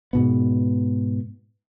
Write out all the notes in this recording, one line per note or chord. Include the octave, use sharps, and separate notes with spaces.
G#2 B2 B3